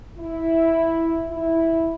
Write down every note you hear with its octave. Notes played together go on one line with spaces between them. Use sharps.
E4
E4